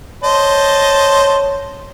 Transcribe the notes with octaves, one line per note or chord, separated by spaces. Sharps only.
C5 C#5 D#5 A5